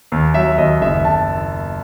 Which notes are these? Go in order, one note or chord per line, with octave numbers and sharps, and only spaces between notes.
D#2
F#3 E5
D#2 D#5
F#1 E5
F#1 A5